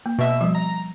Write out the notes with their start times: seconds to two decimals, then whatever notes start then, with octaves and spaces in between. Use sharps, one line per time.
0.06 A#3
0.19 B2 E5
0.41 F3 G3
0.55 A#5